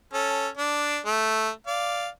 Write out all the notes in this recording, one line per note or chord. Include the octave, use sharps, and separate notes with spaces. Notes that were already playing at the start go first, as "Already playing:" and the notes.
C#4 A4
D4
A3
D5 F5